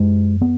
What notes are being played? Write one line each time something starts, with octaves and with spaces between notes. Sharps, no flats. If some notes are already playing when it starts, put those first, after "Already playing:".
Already playing: F#2 G#3
B3